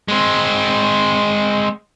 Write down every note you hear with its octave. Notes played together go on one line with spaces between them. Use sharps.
G#3 C4